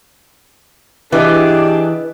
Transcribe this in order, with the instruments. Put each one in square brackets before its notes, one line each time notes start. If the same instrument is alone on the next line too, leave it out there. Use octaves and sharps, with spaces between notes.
[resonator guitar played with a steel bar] E3 [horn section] D4 G4 G#4 [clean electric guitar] B4 D#5